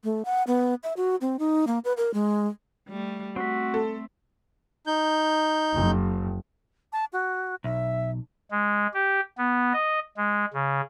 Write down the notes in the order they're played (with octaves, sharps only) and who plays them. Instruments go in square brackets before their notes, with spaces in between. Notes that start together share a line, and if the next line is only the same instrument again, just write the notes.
[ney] A3
F#5
B3
E5
F#4
C4
D#4
A#3
B4
A#4
G#3
[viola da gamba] G3 A3
[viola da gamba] A3 [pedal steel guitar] C4 E5 [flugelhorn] F#4
[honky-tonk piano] A4
[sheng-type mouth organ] D#4 G6
[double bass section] F#1
[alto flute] A5
F#4
[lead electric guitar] B1 [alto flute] E5
[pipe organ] G#3
G4
B3
D#5
G#3
C#3